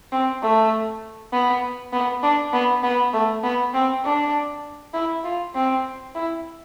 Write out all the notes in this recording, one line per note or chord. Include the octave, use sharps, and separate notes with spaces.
C4
A3
B3
B3
D4
B3
B3
A3
B3
C4
D4
E4
F4
C4
E4